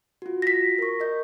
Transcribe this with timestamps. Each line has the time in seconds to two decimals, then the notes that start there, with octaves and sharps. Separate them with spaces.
0.22 F4 F#4
0.42 A#6 B6
0.79 A#4 C#6
1.00 A#4 D#5 G6